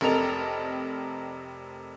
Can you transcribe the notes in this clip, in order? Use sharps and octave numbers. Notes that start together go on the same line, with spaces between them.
F1 C3 A4 A#4 D#5 F7